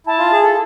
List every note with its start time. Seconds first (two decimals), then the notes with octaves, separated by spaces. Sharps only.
0.07 E4 A5
0.19 F4
0.32 G#4
0.44 A4